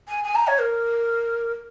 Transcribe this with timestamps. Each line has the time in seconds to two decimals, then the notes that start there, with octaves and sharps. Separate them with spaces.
0.08 G#5
0.24 G#5
0.35 A#5
0.47 C#5
0.59 A#4